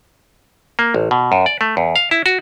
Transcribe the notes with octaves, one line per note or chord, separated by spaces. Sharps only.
A#3
A1
B2
F#2
D5
A3
E2
F5
E4
F#4